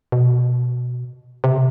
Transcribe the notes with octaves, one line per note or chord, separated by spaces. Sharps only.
B2
C3